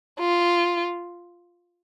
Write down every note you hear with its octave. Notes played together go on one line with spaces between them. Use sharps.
F4